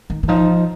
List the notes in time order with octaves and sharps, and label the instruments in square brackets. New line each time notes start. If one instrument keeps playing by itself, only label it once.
[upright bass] D#3
D#3
[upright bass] F3 [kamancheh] D#4